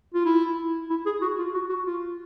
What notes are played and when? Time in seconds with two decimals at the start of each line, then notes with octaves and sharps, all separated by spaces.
0.14 F4
0.26 E4
0.90 E4
1.06 G#4
1.22 F#4
1.39 F4
1.54 F#4
1.70 F#4
1.87 F4